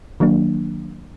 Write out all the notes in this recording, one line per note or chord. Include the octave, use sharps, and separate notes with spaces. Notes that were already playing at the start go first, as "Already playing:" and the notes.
D#3 F#3 A#3 D4